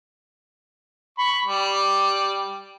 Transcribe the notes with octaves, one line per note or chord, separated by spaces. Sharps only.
B5 C#6
G3